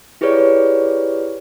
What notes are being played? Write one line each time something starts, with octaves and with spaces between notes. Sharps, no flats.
E4 G4 G#4 B4 C#5 D5